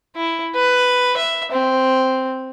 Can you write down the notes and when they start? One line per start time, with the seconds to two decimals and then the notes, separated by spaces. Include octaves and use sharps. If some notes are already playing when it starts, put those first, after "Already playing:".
0.15 E4
0.55 B4
1.17 E5
1.52 C4